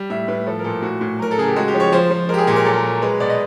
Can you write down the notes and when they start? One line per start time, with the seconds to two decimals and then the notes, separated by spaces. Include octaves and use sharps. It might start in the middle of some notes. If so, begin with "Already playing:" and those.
Already playing: G3
0.10 A2 E5
0.28 A2 B4
0.47 F3 A4
0.59 A#4
0.64 A#2 A4
0.82 A2 F#4
1.01 A2
1.19 F#3 A#4
1.31 A4
1.37 C#3 G#4
1.48 G4
1.56 G#3 F#4
1.68 G4
1.74 F3
1.80 C#5
1.92 F3 C5
2.10 F3
2.29 G#3 A#4
2.34 G4
2.38 G#4
2.47 A#2 G4
2.56 A#4
2.65 F#3 A4
2.74 A#4
2.84 F#3
3.02 G#3 B4
3.20 B2 D5
3.30 D#5